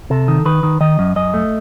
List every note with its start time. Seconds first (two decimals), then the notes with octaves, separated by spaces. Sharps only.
0.10 C3 A4
0.28 D#3
0.45 D#3 B4
0.63 D#3
0.81 D#3 D#5
0.99 F#2
1.16 F#2 D#5
1.34 A3